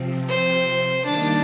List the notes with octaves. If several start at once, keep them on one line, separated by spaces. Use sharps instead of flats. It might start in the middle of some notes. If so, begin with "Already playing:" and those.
Already playing: C3 F3 C4
C5
D#3 G3 A#3 D4 D#4